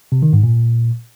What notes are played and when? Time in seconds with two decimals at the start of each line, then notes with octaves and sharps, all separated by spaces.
0.12 C3
0.22 D#3
0.33 G#2
0.44 A#2